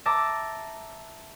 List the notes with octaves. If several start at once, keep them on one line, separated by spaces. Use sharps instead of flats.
E5 A5 A#5 D6